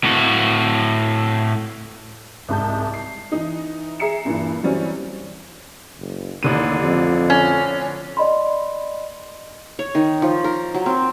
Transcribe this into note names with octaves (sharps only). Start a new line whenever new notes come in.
A2 F#4
C2 G#2 A5 G6
C7
E3 D#4
G#4 E5 A#5 C7 C#7 E7
G2 A#2 E3
E3 F#3 G3 C4 C#4
F#1
A1 D#2 D3 D#7
F2
C#4
D5 D#5 B5 C6
C#5
D#3
F3
A#4
F#3
C4